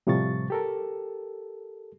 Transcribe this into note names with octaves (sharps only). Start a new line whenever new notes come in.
A2 C3 F3 G3 C#6 A6
G4 A4 A#4